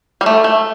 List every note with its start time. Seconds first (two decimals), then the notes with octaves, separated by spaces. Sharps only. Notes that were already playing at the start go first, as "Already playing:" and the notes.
0.21 G3
0.26 A3
0.44 A3